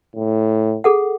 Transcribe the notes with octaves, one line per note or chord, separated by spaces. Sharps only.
A2
G#4 A4 F#5